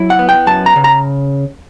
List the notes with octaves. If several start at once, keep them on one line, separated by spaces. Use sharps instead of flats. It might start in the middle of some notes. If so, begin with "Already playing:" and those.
Already playing: F#3 E4
F#5
B3
G5
F#2 A5
A#5
C#3
A#5